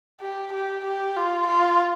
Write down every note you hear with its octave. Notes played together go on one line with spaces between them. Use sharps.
G4
G4
G4
F4
F4